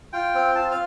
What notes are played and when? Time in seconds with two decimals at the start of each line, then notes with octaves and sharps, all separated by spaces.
0.13 F4 G5
0.35 C4
0.55 F4 A5
0.71 F5